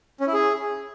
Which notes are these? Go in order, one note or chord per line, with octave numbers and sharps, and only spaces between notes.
C#4
E4
G#4